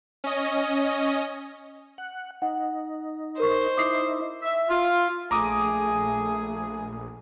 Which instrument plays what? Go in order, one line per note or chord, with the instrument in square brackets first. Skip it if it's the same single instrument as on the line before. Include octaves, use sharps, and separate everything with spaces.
[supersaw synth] C#4 D#5
[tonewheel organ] F#5
[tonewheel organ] D#4 [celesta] F#5
[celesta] A#4 C#6 [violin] C5
[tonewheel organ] D#4 E4 [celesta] D6 D#6 C7
[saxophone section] E5
F4
[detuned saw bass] A#1 [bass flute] A3 [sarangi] G#4 [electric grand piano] A#5 D6 D#6